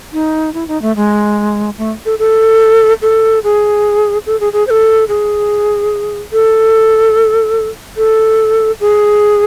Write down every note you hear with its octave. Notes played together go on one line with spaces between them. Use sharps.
D#4
E4
D#4
A3
G#3
A3
A4
A4
A4
G#4
A4
G#4
G#4
C5
A4
G#4
A4
A4
G#4